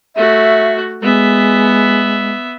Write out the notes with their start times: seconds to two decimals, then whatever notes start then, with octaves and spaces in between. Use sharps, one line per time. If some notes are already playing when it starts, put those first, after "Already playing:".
0.16 A3 F#4 E5
1.02 G#3 B3 E5